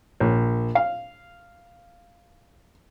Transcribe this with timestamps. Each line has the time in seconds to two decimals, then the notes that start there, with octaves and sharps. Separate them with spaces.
0.20 A#1
0.75 F5